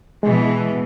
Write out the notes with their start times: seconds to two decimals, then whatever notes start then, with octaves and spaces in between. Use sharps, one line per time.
0.23 B2 E3 G#3